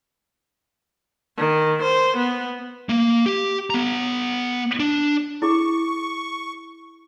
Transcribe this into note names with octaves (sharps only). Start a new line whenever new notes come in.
D#3
C5
B3
A#3
G4
B3 A#5
D4
E4 G#4 C#6